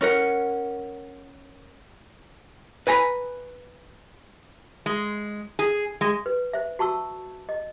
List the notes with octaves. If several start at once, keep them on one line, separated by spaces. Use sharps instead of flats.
C#4 A#4 F#5
B4 G#5 A#5 B5
G#3
G#4
G#3
B4
C5 E5
F#4 A5 C#6 E6
D#5